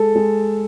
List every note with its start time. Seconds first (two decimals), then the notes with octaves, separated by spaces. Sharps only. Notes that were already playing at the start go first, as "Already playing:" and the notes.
Already playing: G#3 A4
0.16 G#3